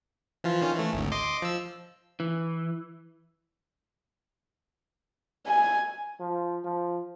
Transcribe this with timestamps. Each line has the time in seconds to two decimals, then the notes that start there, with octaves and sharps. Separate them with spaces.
0.44 E3 F3 F4
0.62 D#3 C#4 F4
0.75 E3 A3
0.93 G#1 D2
1.12 D#5 C6 D6
1.42 F3 E6
2.20 E3
5.47 G#5
6.20 F3
6.64 F3